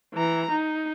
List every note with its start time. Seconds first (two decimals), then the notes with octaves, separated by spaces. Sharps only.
0.14 E3 A#5
0.52 D#4